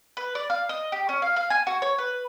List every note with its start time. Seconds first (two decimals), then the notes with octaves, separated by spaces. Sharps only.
0.17 B4
0.35 D5
0.50 F5
0.69 D#5
0.92 G4
1.09 C#4
1.22 F5
1.36 F5
1.50 G#5
1.67 F#4
1.82 C#5
1.98 B4